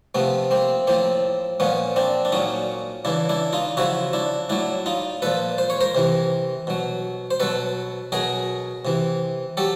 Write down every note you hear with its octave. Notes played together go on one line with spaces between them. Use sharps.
C3 F3 A3 B3
A#3 C4
A2 F3 A#3 C4
A#2 F3 B3 C#4
C4 D4
D4
A#2 F#3 C#4 D#4
C#3 E3 D4 E4
D4 E4
D#4 F4
C#3 F3 E4 F#4
D4 E4
A2 F#3 D4 E4
D#4 F4
A#2 F3 A4 B4
C5
C#5
A#4 C5
C3 E3
B2 F#3
C5
B2 F#3 A4 B4
B2 F#3 G#4 A#4
C3 E3
F#3 G4 A4